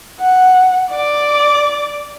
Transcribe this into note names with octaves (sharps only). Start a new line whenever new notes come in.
F#5
D5 D6